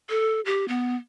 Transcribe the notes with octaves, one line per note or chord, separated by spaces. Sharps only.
A4
G4
B3